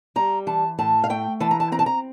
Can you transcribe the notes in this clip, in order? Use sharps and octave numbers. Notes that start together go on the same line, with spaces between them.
G3 A#5
E3 A5
A2 A5
F5
A3 G5
E3 A5
A#5
A5
C4 A#5
A5
A#5